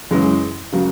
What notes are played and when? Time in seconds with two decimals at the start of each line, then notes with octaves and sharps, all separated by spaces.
0.11 F#2 C#3 E3 G#3
0.72 C#3 F#3 A#3